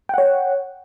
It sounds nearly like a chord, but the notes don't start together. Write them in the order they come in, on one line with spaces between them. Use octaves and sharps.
G5 F#5 C#5